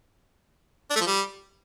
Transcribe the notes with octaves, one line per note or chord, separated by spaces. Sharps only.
D4
A3
F3
G3